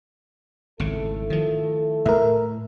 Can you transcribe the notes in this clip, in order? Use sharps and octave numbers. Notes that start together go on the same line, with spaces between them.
G#1 C#3 A3 E4 A4
D#3 F3
A2 A#4 E5